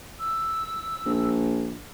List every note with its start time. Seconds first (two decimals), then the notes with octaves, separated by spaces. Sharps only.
0.19 E6
1.05 A#1